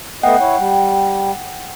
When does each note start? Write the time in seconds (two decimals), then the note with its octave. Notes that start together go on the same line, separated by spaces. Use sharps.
0.23 A3 B3 D#5 F#5 G5
0.41 E4 C#5
0.58 G3